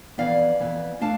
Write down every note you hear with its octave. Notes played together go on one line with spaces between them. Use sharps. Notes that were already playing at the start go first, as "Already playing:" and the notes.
F2 E3 B3 D5 F5
F2 E3 B3
A3 D4 F5 A5